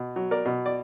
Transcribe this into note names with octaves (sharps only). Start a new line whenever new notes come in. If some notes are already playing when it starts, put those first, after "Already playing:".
Already playing: B2
F#3
A#4 D5
B2
D5